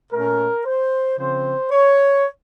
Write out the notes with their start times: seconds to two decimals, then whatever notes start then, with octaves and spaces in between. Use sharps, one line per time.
0.12 A#2 A3 C#4 A#4
0.65 C5
1.18 C#3 F3 C4 C5
1.71 C#5